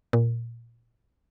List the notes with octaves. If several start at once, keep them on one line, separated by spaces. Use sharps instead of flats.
A#2